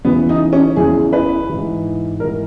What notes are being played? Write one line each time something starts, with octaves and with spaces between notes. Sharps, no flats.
E2 C#3 E3 B3
D#4
C#4
E2 C#3 E3 G#4
B4
G#2 E3
G#2 E3 A#4